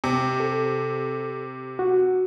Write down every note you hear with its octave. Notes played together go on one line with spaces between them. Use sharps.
C3
A4
F#4